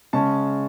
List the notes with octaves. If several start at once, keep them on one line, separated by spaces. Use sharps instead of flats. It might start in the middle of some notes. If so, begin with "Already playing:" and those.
C#3 G#3 C#4 A5